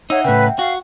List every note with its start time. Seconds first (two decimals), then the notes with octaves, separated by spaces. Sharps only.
0.10 D#4 C#5 E5 F#5 E6
0.24 A2 C#3 B4 G5
0.59 F#4 F5